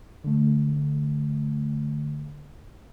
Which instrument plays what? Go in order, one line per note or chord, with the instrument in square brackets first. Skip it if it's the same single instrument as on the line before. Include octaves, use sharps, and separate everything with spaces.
[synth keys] D3 A3